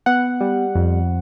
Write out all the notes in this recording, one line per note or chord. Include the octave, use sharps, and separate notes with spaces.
B3 F#5
G3
F2